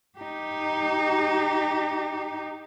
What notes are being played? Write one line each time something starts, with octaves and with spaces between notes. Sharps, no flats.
D#4 G4